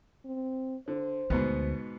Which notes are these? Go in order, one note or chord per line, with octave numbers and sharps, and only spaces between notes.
C4
D3 C5
D2 G#2 B2 B3